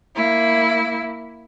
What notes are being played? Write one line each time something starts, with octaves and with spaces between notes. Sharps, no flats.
A#3 E4